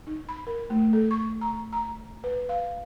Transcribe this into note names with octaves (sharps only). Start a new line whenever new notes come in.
D#4
B5
A#4
A3
A4
C#6
A#5
A#5
B4
F5